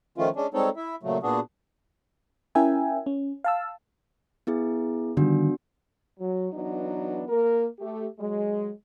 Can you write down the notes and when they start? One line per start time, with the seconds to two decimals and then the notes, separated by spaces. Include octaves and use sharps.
0.18 D#3 F3 A3 C#4 F4
0.36 G#3 C#4 D4
0.54 G3 G#3 C4 D#4 A4 C#5
0.76 E4 E5
1.03 A#2 C#3 F#3 A3
1.23 A#2 B3 D4 F#4 G#4
2.55 C#4 E4 A#4 E5 G5 G#5
3.06 C#4
3.44 F5 A5 E6
4.47 B3 E4 G#4
5.17 D3 D#3 G3 B3 D4 F#4
6.19 F#3
6.52 E3 F#3 B3 D4 D#4
7.29 A#3 A#4
7.78 A3 G4
8.18 F#3 G#3